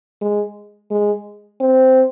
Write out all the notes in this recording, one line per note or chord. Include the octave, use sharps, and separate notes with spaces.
G#3
G#3
C4